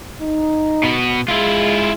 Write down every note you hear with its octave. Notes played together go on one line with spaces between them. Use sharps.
D#4
B2 B3
G#3 E4 F4